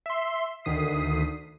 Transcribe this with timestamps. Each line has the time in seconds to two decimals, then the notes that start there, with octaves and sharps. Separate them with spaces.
0.06 E5 C6
0.65 D2 D3 D#3 D#6 B6 C7